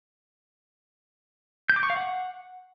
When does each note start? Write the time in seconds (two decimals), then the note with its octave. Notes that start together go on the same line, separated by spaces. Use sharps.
1.70 G6
1.76 D6
1.83 C#6
1.90 F5
1.97 F#5